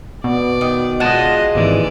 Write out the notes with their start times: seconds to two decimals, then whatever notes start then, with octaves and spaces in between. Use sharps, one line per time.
0.24 B2 D5
0.61 D#3
1.00 G#3 F4 D#5 F#5 A5
1.55 G#1 D#2 E3 D5